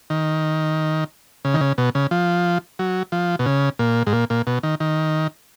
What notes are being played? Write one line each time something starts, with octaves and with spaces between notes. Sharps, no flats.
D#3
C#3
D#3
C#3
B2
C#3
F3
F#3
F3
B2
C#3
A#2
G#2
A#2
A#2
B2
D#3
D#3